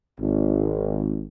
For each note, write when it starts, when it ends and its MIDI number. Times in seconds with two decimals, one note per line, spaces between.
0.19 1.24 32